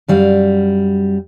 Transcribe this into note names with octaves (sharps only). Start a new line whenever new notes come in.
F#2 G3 F5